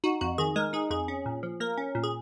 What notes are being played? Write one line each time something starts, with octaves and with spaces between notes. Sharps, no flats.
D#4 F#4
F2 F#4
D#3 G#4
G#3 A#4
D#4 G#4
F2 G#4
C#4
A#2
F3
A#3 A#4
C#4
A#2
G#4